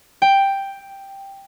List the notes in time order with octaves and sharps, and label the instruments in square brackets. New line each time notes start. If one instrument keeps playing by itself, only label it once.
[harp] G5